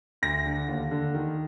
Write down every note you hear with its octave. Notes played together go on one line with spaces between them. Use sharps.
D2 A#6
D3
D#2
D3
D#3